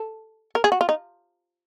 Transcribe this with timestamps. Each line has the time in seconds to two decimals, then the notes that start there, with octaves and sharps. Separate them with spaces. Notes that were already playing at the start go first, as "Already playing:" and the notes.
Already playing: A4
0.55 A#4
0.64 G#4
0.72 F#4
0.81 F4
0.89 D#4